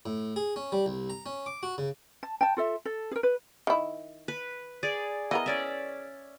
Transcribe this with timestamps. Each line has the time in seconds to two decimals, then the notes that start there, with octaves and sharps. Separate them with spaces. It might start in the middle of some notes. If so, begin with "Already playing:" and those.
0.06 A2
0.36 G#4
0.56 C#4
0.72 G3
0.86 C2
1.10 A#5
1.26 C#4
1.46 D6
1.63 F#4
1.78 C#3
2.23 A5
2.41 G5 A5
2.57 F4 A4 E5
2.85 A4
3.11 G#4 A#4
3.23 B4
3.67 D#3 E4
4.28 B4
4.83 G#4 D5
5.31 E3 B3 A#4 D#5
5.46 C#4 D5 E5